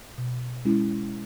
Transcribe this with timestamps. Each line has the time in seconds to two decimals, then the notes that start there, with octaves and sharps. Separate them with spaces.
0.18 B2
0.65 G#3 C#4 E4